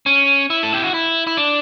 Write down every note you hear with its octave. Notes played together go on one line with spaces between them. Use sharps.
C#4
E4
A4
G4
F#4
E4
E4
D4